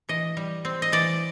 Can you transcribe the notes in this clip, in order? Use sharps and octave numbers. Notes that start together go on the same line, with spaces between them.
E3 D#5
G3
C4
D#5
E3 D5